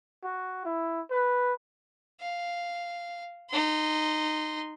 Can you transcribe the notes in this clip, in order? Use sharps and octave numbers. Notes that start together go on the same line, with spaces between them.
F#4
E4
B4
F5
D#4 C6